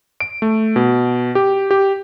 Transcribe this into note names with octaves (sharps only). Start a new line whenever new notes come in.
D7
A3
B2
G4
G4